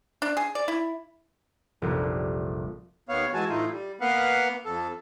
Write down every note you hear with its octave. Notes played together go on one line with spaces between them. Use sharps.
D4
G#4
D5
E4
F1 A#1 G3
D#2 B3 C#5 F5
E3 G#3 F#4 G#5 A5
A2 E3 A3 D#4 F4
G3
A#3 B3 B4 F5 F#5
F2 A4